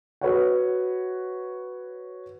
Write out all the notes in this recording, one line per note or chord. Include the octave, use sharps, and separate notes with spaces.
F#4 B4 C#5 F#5